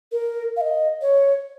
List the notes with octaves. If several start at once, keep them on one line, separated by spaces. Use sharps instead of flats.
A#4
F5
D#5
C#5